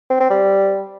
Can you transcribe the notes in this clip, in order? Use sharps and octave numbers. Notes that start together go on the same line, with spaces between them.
C4
C4
G3